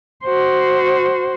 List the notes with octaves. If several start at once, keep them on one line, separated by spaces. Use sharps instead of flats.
F#4 C5